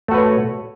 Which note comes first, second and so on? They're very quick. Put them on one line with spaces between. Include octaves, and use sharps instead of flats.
A3 F#4 B4 C#5